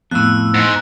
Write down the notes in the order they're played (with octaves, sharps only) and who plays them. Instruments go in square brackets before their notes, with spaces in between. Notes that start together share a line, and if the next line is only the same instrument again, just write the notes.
[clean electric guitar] F2 A2 [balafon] B3 [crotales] E6 F#6
[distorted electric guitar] G#2